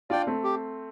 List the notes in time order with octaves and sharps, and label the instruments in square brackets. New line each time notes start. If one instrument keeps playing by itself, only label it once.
[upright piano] D4 F4 [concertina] D5 G5
[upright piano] A3 C4
[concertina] G4